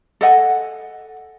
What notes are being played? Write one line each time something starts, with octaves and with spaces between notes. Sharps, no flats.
A4 D#5 F#5 G#5